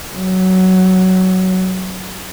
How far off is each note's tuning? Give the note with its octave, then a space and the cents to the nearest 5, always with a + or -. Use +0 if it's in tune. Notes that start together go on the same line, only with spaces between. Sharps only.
F#3 +10